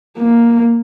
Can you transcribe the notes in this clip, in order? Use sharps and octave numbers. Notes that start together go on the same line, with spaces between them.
A#3